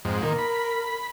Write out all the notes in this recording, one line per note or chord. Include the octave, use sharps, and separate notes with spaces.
F2 G#2
A#2 D#3 A#4
B5